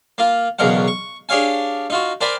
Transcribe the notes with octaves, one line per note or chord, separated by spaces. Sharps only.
A#3 F4
B1 E2 C#3 A#4 F#5
C#6
D4 G4 G#4 C#5 F5 G#5
D#4 F4 F#4
A#4 C5 D5 G5 G#5 B5